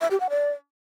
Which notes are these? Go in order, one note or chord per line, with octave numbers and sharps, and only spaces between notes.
E5
G4
F#5
D5